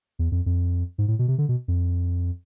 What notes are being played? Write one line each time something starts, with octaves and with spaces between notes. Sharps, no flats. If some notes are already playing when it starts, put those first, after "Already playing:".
E2
F2
F2
G#2
A2
B2
C3
D3
B2
F2